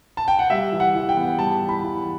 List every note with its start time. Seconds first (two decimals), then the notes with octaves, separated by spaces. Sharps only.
0.17 A5
0.28 G5
0.39 F#5
0.50 G3 E5
0.72 E3
0.80 F#5
0.95 E3
1.09 G5
1.16 B3
1.38 G3 A5
1.61 E3
1.69 B5
1.83 E3